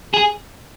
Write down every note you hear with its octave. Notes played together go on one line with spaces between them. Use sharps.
G#4